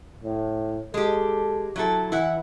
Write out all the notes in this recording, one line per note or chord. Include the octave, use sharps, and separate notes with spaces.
A2
G#3 G4 A4
F#3 E4 A4
E3 E4 F#5